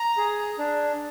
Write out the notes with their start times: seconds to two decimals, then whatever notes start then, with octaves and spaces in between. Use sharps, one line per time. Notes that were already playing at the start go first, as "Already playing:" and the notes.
Already playing: A#5
0.17 G#4
0.59 D4